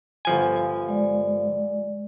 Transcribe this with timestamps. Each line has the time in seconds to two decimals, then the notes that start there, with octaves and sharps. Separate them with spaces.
0.25 G1 F3 G#5
0.88 G#3 D5